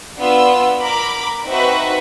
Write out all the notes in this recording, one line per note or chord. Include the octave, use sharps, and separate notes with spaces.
B3 D4 F4 E6
A#4 B5 D6
C4 D#4 F#4 B4 E5